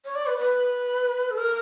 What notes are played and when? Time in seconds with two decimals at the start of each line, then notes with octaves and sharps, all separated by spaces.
0.05 C#5
0.15 D5
0.26 B4
0.38 B4
1.31 A4
1.38 A#4